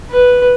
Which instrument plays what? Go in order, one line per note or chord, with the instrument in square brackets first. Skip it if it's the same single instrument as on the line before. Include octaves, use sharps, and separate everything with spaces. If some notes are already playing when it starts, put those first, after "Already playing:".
[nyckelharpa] B4